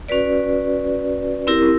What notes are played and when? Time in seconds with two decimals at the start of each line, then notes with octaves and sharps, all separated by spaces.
0.09 C#4 F#4 B4 D5
1.47 C4 E4 G4 A#4